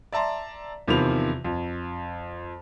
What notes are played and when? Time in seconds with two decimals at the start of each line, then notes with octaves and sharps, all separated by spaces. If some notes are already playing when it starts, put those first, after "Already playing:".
0.12 D5 E5 A5 A#5 C6
0.88 E2 C3 D#3 F3 B5 F7
1.45 F2